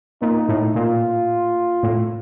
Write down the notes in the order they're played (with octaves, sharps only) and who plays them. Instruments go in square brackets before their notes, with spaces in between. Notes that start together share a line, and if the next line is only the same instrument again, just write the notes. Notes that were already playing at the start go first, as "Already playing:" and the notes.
[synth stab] A#2 [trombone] D#4
[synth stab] A2
[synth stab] A#2 [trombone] F4
[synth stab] A2